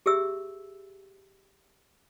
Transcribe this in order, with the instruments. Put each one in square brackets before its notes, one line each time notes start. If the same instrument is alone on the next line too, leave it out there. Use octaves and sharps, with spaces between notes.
[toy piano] G4 G#4 E5 E6